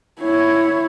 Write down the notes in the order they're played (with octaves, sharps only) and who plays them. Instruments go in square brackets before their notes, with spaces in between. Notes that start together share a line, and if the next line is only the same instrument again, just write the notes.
[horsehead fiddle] E4 C#5